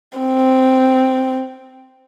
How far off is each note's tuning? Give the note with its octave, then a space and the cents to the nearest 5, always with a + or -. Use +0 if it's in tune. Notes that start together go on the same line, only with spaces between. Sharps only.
C4 -5